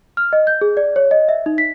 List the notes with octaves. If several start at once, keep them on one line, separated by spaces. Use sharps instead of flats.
F6
D#5
G6
G#4
D5
C#5
D#5
E5
D#4
B6